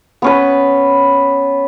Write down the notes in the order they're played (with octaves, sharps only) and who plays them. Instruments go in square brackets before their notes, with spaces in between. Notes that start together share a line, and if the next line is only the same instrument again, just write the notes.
[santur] B3 C#4 B4